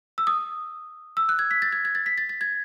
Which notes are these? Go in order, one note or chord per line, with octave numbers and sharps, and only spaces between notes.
E6
D#6
E6
F#6
G#6
B6
A6
G#6
G#6
A6
B6
A6
A6
G#6